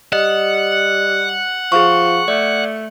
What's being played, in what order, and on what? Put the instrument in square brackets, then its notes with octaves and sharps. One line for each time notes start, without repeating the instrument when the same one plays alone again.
[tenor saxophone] G3 [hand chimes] D#5 [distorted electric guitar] F#5
[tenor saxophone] F3 [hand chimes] G#4 C#6
[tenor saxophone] A3 [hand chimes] D5